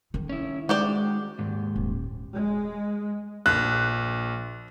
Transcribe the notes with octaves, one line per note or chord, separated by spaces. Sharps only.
D#3 D#4
C#4 E4
G#3 F#4 G4 D5
D#2 G#2
D#1
G#3
A#1 F#6